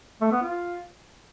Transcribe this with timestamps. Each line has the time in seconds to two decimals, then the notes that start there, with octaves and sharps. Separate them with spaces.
0.21 A3
0.32 B3
0.42 F4